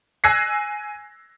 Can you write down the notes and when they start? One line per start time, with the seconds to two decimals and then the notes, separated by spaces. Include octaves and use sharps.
0.24 G#5 E6 F#6 G#6 A#6 C7